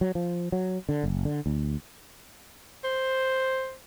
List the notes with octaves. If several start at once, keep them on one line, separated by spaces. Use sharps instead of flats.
F#3
F3
F#3
D3
F#1
D3
D2
C5